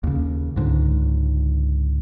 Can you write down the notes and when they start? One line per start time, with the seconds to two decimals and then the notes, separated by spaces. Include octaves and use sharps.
0.03 D#2 C#3
0.56 C#2 G#2 D3